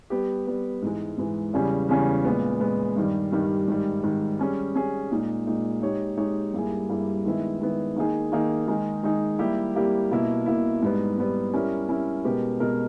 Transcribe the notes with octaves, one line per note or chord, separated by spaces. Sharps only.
G3 B3 G4
G3 B3 G4
G#2 E3 G#3
G#2 E3 G#3
E2 C#3 G3 C#4 G#4
E2 C#3 G3 C#4 G#4
A#2 G#3 B3
A#2 G#3 B3
G2 D#3 G3
G2 D#3 G3
G#2 D#3 G3
G#2 D#3 G3
G3 C#4 G#4
G3 C#4 G#4
A#2 G#3 D#4
A#2 G#3 D#4
G#3 D#4 G4 C#5
G#3 D#4 G4 C#5
G2 G3 A#3 E4 G#4
G2 G3 A#3 E4 G#4
D#3 G#3 B3 E4
D#3 G#3 B3 E4
D#3 A#3 D#4 G#4
D#3 A#3 D#4 G#4
D#3 G#3 D#4 G#4
D#3 G#3 D#4 G#4
G3 A#3 E4 G4
G3 A#3 E4 G4
B2 A#3 E4
B2 A#3 E4
G#2 G3 B3
G#2 G3 B3
G3 C#4 E4 A#4
G3 C#4 E4 A#4
B2 G#3 B3 G4 A#4
B2 G#3 B3 G4 A#4